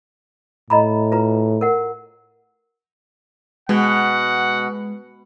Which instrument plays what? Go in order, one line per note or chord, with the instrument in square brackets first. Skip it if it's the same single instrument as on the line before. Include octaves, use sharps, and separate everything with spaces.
[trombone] A2 [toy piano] D#5 A#5 B5
[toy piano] F4 B4 A#5
A#4 F#5
[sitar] B2 [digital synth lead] G#3 [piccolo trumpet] F#5